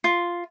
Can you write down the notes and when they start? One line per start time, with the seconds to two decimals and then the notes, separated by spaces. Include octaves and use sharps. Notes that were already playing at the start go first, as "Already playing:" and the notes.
0.04 F4